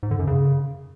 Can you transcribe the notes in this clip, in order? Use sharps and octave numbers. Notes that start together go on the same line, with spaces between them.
G#2
D3
F#2
C#3